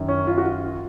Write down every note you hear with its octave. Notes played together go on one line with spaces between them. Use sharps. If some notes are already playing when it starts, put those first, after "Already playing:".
Already playing: F#2 D#3
C#4
F4
F#4
F4